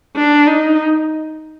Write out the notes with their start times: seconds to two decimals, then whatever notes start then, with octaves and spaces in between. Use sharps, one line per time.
0.16 D4
0.47 D#4